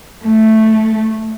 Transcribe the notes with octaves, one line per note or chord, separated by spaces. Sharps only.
A3